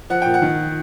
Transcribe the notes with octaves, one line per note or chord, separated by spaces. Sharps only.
F3 F#5
A#2 G5
F#5
D#3